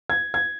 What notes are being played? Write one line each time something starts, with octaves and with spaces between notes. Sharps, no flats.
G#6
G#6